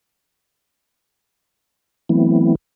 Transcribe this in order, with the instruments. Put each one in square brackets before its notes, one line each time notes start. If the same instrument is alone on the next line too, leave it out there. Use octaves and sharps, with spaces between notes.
[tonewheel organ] E3 F#3 A3 B3 C4 E4